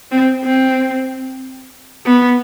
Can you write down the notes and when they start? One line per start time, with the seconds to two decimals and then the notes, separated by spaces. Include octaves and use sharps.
0.11 C4
0.44 C4
2.06 B3